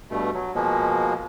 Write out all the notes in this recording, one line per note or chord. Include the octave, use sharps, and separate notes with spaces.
G2 B2 A3
F#3
B2 F3 G#3 A#3